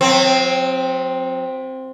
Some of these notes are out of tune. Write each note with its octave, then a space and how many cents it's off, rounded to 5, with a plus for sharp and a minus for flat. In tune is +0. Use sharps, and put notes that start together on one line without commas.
F#3 -40 C4 +0